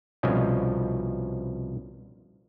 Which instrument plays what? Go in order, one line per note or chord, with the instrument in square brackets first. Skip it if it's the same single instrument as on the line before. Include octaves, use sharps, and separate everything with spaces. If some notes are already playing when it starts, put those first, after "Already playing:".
[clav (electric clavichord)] C2 B2 F3 C#4 D#5